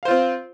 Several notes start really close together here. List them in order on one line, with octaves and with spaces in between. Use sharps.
F5 C5 F4 C4